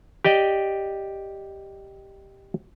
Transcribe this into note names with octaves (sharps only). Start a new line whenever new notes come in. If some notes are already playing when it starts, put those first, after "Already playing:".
G4 D5 D#5 G5